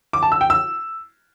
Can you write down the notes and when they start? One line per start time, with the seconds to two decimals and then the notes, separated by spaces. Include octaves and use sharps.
0.13 D6
0.23 A5
0.32 E6
0.41 G5
0.50 E6